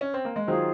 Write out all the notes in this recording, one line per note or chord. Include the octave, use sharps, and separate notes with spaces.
C#4
C4
A#3
G#3
D#3 F#3 F4 G#4 C5 F5